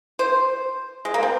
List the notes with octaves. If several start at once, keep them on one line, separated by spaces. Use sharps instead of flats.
C5
G#3
A#3
C4